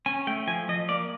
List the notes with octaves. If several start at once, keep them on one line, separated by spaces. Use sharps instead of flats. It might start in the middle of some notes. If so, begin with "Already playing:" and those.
C#4 G#5
A3 G5
F3 G#5
F3 D#5
A#3 D5